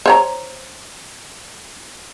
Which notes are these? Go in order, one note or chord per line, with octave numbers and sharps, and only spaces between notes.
C5 C#5 A#5